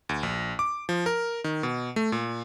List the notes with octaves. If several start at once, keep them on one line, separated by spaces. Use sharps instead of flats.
D2
A#1
D6
F3
A#4
D#3
B2
A3
A#2